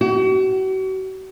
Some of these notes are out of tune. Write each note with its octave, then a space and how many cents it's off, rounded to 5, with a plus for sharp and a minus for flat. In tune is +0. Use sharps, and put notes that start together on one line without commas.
F#4 +40